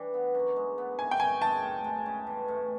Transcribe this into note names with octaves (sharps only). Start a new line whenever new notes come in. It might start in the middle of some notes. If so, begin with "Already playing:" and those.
Already playing: E3 G3 D4
B3
F#2
G#3
B3
D#3 G#5
G5
F#2 G#5
G#3 A5
A2
G#3
C#4
E3
A2